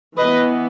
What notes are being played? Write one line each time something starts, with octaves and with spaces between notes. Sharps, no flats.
E3 B3 B4 D#5